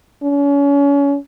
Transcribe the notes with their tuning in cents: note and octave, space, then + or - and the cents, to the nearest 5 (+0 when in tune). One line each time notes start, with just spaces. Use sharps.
C#4 +35